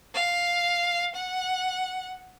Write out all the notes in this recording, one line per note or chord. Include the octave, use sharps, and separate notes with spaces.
F5
F#5